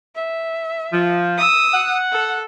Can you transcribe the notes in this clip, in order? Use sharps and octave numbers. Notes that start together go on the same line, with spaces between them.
E5
F3
D#6 E6
F#5
A4